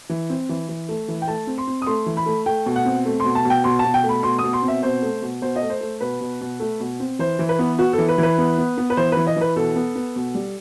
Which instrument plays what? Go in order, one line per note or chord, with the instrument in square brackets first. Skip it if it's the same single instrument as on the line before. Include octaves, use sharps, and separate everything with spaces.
[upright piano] E3
C4
E3
E3
A3
E3
G5
A3 A5
C4
C6
C4
D#6
A3 C6
E3
B5
A3
A3 G5
B2
F#5
C4
A3
B2 C6
A5
B2
G5
B2 C6
A5
B2
G5
A3
B5
B2 C6
B2 D#6
C6
C4
E5
B2 C5
A3
B2
B2 C5
D#5
A3
C5
A3
B2 B4
B2
B2
A3
B2
C4
E3 C5
E3
B4
B3
B3 F#4
A4
E3
B4
E3
B4
B3
B3
B3
B4
E3 C5
E3 B4
D#5
E3 B4
B2 A4
B3
B3
B2
G3